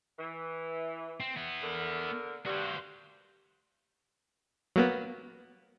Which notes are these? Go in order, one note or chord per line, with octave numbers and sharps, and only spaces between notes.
E3
C4
B3 E4
D3 A#4
G2 F#4 C5
F#3 A#3 B3